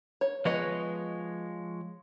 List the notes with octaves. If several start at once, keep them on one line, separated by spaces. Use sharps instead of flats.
C#5
F3 G#3 B3 C#5 D#5